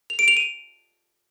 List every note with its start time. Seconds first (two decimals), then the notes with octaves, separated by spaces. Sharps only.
0.10 F7
0.19 D7
0.28 F7
0.37 D#7